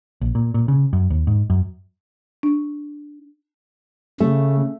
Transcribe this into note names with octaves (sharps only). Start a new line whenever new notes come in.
A#1
A#2
A#2
C#3
F#2
D#2
G#2
F#2
D4
C#3 A3